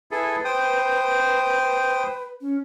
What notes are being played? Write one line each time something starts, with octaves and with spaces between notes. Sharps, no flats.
E4 G#4 A4 B4
C5 G5 D#6
B4
C#4